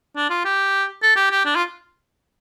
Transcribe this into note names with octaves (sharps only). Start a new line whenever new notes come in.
D4
F4
G4
A4
G4
G4
D4
F4